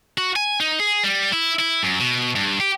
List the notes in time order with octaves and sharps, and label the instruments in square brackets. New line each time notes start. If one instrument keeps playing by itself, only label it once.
[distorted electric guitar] F#4
G#5
D#4
G#4
G3
E4
E4
F#2
B2
G2
G4